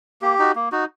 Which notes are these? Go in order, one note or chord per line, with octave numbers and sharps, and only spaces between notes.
A#3 G4
D#4 F#4
A#3
D#4 F#4